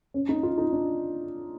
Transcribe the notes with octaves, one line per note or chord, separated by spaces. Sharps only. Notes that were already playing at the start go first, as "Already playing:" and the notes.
C#4
D#4
F4
D#4
D4